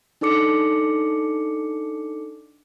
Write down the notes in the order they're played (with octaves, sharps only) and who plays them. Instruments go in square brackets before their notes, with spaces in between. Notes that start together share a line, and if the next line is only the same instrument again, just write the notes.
[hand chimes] D4 D#4 A4 D6 C#7